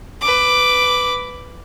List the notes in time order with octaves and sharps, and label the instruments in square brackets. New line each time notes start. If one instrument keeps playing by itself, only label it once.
[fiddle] B4 D6